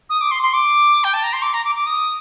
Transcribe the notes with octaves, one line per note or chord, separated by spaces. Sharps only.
D#6
D6
C6
C6
D6
G5
A5
A#5
C6
D6
A#5
D6
D6
D#6